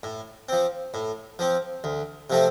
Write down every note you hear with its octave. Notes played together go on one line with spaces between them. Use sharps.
A2
F3 C4
A2
F3 C4
D2
C3 F3 A3 C4